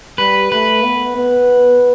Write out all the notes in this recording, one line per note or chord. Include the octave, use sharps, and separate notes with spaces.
G3 B4
A3 B4
B3
B3